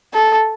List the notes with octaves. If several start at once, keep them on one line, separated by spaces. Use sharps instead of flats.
A4